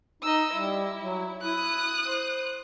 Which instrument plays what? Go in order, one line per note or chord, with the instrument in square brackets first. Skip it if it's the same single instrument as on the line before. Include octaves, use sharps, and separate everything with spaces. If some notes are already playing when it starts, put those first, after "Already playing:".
[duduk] D#4 [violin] D#5 E6
[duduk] G3 [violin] E4
[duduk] F#3
[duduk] E4 [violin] D#6 F#6
[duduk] C5